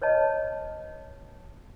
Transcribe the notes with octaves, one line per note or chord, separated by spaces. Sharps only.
B4 C#5 D#5 A5